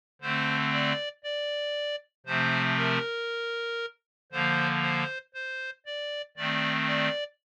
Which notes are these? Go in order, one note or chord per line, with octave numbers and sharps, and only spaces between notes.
D3 A3 C4 C5
D5
D5
C3 F3 A3 C4 C5
A#4
D3 F3 A#3 C5
C5
C5
D5
D#3 A3 C4 D5
D5